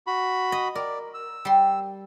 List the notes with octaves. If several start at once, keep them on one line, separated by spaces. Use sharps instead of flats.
F#4 B5
D#5
A#4 D5
E6
G3 C6